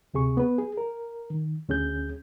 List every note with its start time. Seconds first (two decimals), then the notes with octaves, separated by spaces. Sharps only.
0.14 D2 C3 G#4 C#6
0.37 B3 B4
0.58 G#4
0.77 A#4
1.30 D#3
1.69 D2 C#4 G#4 G6